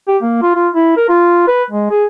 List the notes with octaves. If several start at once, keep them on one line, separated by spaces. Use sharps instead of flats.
G4
A#3
F4
F4
E4
A#4
F4
B4
G#3
G#4